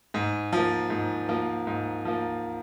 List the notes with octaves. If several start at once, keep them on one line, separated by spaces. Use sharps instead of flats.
G#2
F3 A#3
G#2
F3 A#3
G#2
F3 A#3